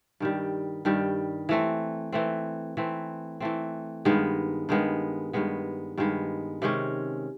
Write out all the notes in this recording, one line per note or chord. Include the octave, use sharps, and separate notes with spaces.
G2 D#3 G3
G2 D#3 G3
E3 A3 C4
E3 A3 C4
E3 A3 C4
E3 A3 C4
G2 D#3 G#3 B3
G2 D#3 G#3 B3
G2 D#3 G#3 B3
G2 D#3 G#3 B3
C3 D#3 G#3 C#4